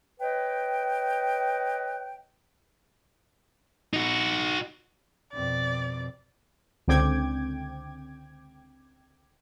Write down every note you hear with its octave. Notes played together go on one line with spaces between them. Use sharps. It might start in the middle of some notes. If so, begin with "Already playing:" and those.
B4 C#5 D#5 G5
D#4 F#4
F2 B2 D5
C#2 D3 C4 G5 D6 G#6